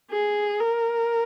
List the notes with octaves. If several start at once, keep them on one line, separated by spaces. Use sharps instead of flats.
G#4
A#4